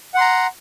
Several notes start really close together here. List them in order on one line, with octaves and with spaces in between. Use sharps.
F#5 C6 A#5